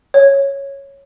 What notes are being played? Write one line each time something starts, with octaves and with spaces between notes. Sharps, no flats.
C#5